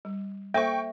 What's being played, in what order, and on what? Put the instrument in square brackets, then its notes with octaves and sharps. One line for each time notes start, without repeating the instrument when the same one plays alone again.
[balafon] G3
[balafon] A#3 A4 C5 [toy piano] E5 [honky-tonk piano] G5 C#6